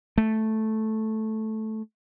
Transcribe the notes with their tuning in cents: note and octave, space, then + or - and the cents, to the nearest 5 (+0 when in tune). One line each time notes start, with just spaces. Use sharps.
A3 -5